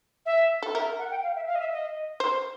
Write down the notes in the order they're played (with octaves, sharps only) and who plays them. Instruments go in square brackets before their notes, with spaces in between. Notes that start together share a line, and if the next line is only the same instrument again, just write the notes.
[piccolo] E5
[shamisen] A4
[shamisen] A#4 [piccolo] E5
[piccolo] F#5
G5
F5
E5
F5
D#5
E5
D#5
[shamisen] C5